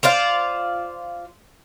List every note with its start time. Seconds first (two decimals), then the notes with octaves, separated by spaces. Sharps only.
0.03 F4 C5 D5 F5